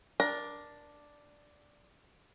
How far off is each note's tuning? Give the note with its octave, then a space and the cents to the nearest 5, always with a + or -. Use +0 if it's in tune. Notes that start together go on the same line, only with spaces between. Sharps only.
D4 +0 A#4 +20 A#5 +20